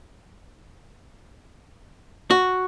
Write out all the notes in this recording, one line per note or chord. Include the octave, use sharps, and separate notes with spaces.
F#4